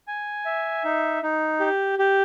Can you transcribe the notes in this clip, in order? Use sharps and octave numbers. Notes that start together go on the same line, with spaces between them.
G#5
E5
D#4
D#4
G4
G4